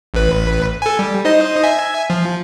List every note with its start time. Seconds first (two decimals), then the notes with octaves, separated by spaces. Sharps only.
0.14 A1 B4
0.82 A4 G#5
0.99 G3
1.25 D#4 C5 D#5
1.64 E5 G#5
2.10 F3